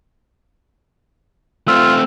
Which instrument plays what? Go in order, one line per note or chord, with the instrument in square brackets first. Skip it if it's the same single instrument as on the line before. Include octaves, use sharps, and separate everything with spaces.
[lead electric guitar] A3 C4 [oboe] F4 [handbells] E6